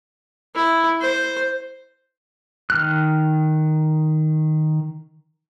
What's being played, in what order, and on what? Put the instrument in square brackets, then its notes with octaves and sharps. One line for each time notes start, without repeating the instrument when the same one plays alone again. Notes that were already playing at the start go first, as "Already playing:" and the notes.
[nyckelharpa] E4
C5
[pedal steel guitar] D#3 F6 F#6